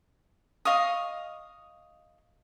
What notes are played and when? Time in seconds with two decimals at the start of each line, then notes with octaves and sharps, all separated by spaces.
0.65 D#5 F5 C#6 D#6